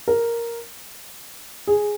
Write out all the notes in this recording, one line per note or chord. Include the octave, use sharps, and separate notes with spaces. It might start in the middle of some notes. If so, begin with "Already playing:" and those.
A#4
G#4